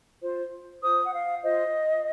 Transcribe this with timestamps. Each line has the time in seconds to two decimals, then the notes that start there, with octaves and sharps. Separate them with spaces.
0.22 F4 C5
0.82 F4 C5 D#6
1.04 F#5
1.13 F5
1.43 F4 C5 D#5